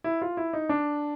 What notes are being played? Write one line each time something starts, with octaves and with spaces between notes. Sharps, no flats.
E4
F4
E4
D#4
D4